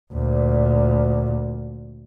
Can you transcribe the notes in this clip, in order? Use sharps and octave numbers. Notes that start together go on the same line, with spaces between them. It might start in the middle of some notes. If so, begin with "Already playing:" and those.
D2 A#2